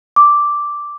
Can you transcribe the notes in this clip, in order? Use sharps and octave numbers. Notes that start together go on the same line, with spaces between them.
D6